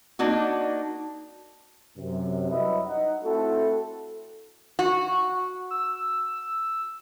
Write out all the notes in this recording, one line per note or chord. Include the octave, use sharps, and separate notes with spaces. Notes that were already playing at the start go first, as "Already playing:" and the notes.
A#3 D4 D#4 F#4
F#2 C3
F#3 G3 E4 B4 D#5 E5
D#4 F#5
A3 C4 E4 F#4 A4
F#4
E6